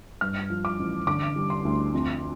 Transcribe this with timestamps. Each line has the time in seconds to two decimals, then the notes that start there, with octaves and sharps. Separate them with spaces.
0.21 G2 F6
0.50 F3
0.65 D6
0.79 A1
1.07 D3 D6
1.36 G3
1.50 C6
1.65 D2
1.93 F2